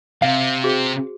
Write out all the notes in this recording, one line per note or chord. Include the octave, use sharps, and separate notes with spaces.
C3 F5
F#4 G#4 C5